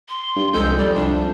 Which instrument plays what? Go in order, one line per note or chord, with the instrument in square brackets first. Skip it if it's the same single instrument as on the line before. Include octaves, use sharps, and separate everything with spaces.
[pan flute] C6
[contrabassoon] G2
[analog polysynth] C2 G#3 G6 [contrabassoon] F2 [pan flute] A4
[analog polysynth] G3 [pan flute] D5
[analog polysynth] C2 [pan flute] D4